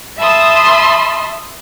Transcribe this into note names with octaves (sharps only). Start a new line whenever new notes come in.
E5 A5 B5 C6 D#6